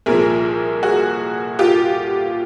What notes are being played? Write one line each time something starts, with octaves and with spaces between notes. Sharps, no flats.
C2 A#2 F3 G#4 A#4
F#4 G#4
F4 G4